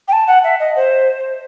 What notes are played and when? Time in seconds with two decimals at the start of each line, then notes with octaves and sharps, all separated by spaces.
0.08 G5
0.13 A5
0.27 F#5
0.44 E5
0.60 D#5
0.76 C5